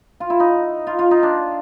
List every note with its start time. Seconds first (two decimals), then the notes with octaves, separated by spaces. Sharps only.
0.20 F4
0.30 E4
0.40 D#4
0.87 F4
0.99 F4
1.11 D#4
1.23 D4